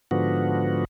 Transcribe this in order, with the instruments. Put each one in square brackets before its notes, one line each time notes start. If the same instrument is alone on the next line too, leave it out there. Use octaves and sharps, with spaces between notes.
[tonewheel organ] G#2 D3 F3 B3 F#4